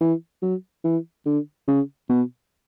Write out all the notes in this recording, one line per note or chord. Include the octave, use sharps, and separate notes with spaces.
E3
F#3
E3
D3
C#3
B2